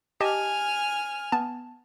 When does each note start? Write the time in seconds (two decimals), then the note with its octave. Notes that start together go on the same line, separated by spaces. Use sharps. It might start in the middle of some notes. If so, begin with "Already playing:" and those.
0.21 G4 D#5 G#5 A5 F6
1.32 B3 A5